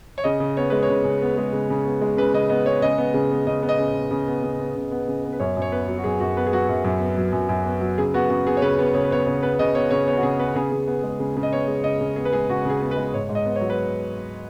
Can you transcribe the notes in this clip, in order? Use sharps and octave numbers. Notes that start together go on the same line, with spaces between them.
C#5
C#3 D#5
C#3
B3 C#5
G#3 B4
C#5
C#3
C#3
B3
G#3
C#3
C#3
B3
G#3
C#3 B4
C#3 D#5
B3 D#5
G#3 C#5
C#3 D#5
B3
C#3
B3
C#3 D#5
B3
D#5
C#3
B3
C#3
B3
C#3
B3
C#3
B3
C#3
B3
B4
F#2 C#5
F#2
C#5
B3 B4
F#3
F#4
F#2 G#4
F#2 F#4
B3 B4
G#4
F#3 F#4
F#2 F#4
F#2
B3
F#3
F#2
F#2
B3
F#3
C#3 G#4
B3 F#4
C#3 F#4
B3 G#4
C#5
C#3 B4
B3
C#3 C#5
B4
B3 C#5
C#3 C#5
B3 B4
C#3 D#5
B3 C#5
C#3 C#5
B3 C#5
F#4
C#3 G#4
B3 B4
C#3 G#4
C#3
B3
G#3
C#3
C#3
D#5
B3 C#5
G#3
C#3 D#5
C#3
B3 G#4
B4
G#3 G#4
C#3 F#4
C#3 G#4
B3
B4
G#3
G#2 C#5
G#2
D#5
B3
C#5
F#3
B4